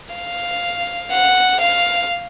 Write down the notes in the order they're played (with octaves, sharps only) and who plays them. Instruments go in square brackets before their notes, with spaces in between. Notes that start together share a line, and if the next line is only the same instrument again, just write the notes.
[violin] F5
F#5
F5